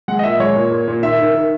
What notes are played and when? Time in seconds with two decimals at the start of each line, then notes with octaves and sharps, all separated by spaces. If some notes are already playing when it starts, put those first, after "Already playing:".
0.08 G#3 F#5
0.19 D#5
0.23 A#2 E5
0.40 G#3 C#5
0.56 A#2
0.71 A#2
0.88 A#2
1.03 D#3 E5
1.19 D#3
1.35 D#3